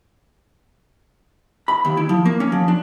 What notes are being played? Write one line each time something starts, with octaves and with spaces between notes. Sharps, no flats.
B5
D#2
E4
F3
A#3
C#4
F3
D4